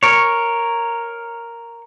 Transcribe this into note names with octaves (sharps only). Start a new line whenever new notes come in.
A#4 C#5